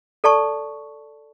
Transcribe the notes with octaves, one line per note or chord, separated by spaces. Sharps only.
A4 D5 A5 C#6